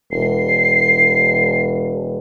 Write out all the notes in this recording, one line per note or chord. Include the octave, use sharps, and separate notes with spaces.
E1 C7